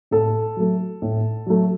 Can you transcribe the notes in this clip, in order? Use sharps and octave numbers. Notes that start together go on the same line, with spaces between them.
A2 A4
F#3 A3
A2
F#3 A3